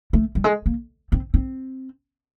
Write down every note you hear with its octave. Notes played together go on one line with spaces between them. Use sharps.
A3
G3
G#3
A#3
C4
C4